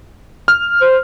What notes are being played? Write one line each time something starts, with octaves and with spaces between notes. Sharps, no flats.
F6
C5